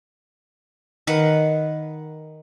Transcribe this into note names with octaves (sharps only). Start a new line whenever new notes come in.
D#3 B4 F#5